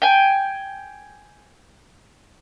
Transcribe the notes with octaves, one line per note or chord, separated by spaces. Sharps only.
G5 G#5